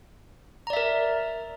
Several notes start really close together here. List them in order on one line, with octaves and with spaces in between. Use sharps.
A#5 D5 E5 A#4